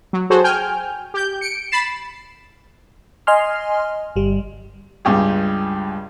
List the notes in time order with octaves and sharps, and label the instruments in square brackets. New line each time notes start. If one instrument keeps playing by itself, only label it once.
[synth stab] F#3
F#4 G#4 A4 C5 C#5
G5 G#5 F6 G6
G4 G6
C#7 D7
B5 A6 C7 E7
[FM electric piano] D#5 G#5 C6 F6
G1 G3
[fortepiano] C#2 G2 G4 G#4